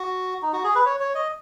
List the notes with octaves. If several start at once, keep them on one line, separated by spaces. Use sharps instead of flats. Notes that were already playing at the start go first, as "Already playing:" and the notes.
Already playing: F#4
D#4
F#4
G#4
B4
C#5
C#5
D#5